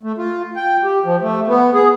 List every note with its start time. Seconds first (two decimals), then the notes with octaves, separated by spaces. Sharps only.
0.03 A3
0.18 F4
0.56 G5
0.84 G4
1.05 F3
1.22 A3
1.47 B3
1.74 G#4